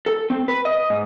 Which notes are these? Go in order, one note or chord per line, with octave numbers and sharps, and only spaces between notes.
A4
C4
B4
D#5
G#2